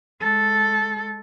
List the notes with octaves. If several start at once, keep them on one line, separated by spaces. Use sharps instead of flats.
G#3 A4